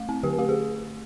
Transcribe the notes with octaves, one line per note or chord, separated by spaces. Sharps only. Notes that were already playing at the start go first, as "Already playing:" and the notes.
Already playing: A3
C4
D3 G4
A3 G4
G#4